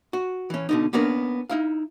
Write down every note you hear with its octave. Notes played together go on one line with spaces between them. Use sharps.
F#4
E3 C#4
B2 D3 D#4
A#3 B3 C#4 D4 A#4
D#4 E4 F5